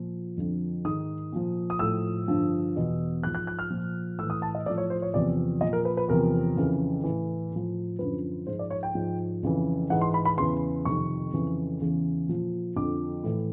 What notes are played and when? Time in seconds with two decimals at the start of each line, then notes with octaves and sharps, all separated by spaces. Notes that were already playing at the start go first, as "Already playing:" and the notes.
Already playing: A#2 F3
0.37 F2 D3 F3
0.84 G#2 D#3 D#6
1.33 A#2 F3
1.70 D#6
1.79 A2 F3 E6
2.28 G2 D3 F3
2.76 E2 B2
3.22 G#2 F#6
3.27 F3
3.35 F#6
3.47 F#6
3.59 F6
3.71 A#2 F3
4.19 A2 E6
4.23 E3
4.30 D#6
4.42 A5
4.55 D#5
4.66 A2 D5
4.70 F3
4.78 C#5
4.90 C5
5.02 C#5
5.14 E2 C3 F3 D5
5.61 A#2 F3 D#5
5.73 A#4
5.85 B4
5.97 B4
6.08 E2 C3 F3 A#4
6.57 F2 C#3 E3
7.04 A2 E3
7.51 A2 F3
7.99 F#2 D3 F3 B4
8.47 G#2 F3 C5
8.59 D5
8.70 C#5
8.83 G5
8.95 G#2 F3
9.43 F2 C#3 E3
9.90 G#2 E3 F#5
10.01 C6
10.14 B5
10.25 B5
10.37 E2 C#3 E3 C6
10.85 F2 C3 D#3 C#6
11.33 F2 C#3 E3
11.80 E2 C#3 E3
12.28 A#2 F3
12.76 F2 D3 F3 D6
13.23 A2 E3